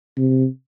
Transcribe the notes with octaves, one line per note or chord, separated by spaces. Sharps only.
C3